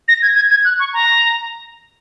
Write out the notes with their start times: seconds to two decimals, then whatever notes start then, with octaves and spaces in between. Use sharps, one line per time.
0.08 A#6
0.22 G#6
0.36 G#6
0.51 G#6
0.64 F#6
0.79 C#6
0.93 A#5